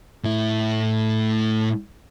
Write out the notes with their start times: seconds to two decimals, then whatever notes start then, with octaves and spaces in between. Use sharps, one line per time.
0.24 A2 E4